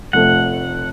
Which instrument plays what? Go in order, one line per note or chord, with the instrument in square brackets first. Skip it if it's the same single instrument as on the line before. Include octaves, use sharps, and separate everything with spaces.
[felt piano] F1 F3 A3 [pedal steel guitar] F#5